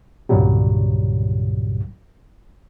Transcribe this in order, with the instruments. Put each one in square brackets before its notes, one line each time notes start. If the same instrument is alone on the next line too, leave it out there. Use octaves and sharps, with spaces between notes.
[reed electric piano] C2 G2 A#2 C#3 F#3 G3